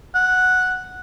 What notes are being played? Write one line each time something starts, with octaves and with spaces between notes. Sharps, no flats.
F#5